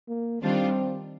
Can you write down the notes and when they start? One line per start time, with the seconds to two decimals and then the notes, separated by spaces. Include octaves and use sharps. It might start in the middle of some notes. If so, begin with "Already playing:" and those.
0.08 A#3
0.42 D#3 G3 C4 D4 F4